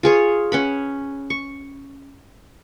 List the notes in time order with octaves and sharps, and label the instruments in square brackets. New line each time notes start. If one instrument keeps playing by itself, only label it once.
[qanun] F4 G#4 C#5
C#4 F#5 B5
C#6